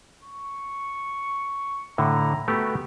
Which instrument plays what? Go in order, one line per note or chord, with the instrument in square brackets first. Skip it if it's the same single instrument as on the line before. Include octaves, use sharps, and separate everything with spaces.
[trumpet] C#6
[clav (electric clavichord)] A2 D3 [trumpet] A#5
[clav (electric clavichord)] A3 B3 G4 [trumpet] F#4